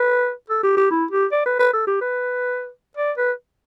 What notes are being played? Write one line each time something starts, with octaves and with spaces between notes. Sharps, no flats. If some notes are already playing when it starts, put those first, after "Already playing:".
Already playing: B4
A4
G4
G4
E4
G4
D5
B4
B4
A4
G4
B4
D5
B4